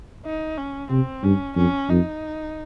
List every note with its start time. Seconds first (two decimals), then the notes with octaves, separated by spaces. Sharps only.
0.25 D#4
0.57 C#4
0.91 C3 C4
1.24 G2 C#4
1.56 F2 C#4
1.90 F2 D#4